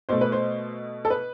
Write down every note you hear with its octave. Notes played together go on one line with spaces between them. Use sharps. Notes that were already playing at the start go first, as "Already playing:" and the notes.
B2 A3 C5
B4
C5
A4
B4